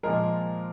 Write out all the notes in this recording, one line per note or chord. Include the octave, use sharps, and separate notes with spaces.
A#2 F3 G#3 A#4